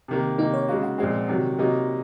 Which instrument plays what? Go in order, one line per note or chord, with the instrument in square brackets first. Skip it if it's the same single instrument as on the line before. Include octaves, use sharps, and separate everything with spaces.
[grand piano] C3 D#3 A#3
[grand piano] C3 D#3 A#3 [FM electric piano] D#4
[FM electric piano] C#5
[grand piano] C#3 G#3 D#4 F#4 [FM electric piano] F5
[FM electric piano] F#5
[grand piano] A#2 F3 G#3 C4 [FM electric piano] F#5
[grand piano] C3 D#3 F#3
C3 F#3 A#3 D#4